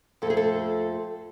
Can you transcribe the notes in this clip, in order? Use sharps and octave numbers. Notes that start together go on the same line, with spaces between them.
F2 F3 A3 G#4 A4
A4